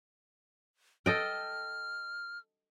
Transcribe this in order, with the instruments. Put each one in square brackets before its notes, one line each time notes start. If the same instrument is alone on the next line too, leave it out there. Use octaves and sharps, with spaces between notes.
[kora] A4 D#5 G5 [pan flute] F6